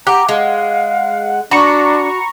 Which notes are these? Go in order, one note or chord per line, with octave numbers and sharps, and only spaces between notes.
G4 F#5 A#5
G#3 F5
D4 F#4 A#5 B5 C#6